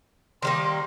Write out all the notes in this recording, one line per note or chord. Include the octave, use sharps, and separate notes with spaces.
D#3 G3 A#3 C6